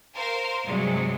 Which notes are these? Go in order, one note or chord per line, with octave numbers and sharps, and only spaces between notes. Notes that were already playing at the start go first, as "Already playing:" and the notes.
A#4 C5 F5 C6
G2 C3 F#3 G#3